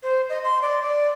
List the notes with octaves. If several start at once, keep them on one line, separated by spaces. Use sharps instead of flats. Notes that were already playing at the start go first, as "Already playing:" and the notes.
C5
D#5
C6
D5
D5